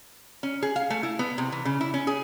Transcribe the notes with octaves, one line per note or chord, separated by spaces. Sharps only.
C#4
G#4
F5
A3
E4
B3
C3
E3
C#3
E4
C#4
G#4